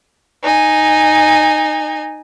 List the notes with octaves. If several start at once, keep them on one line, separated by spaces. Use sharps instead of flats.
D#4 G#5